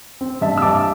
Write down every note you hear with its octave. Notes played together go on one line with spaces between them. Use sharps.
C4
G2 E5 A5
E6
G2 A5 D6